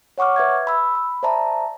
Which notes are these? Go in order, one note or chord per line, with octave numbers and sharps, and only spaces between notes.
C#5 F#5 C#6 D6 F6
B4 E5 G#6
B5 E6
B5
C5 D5 E5 A5 A#5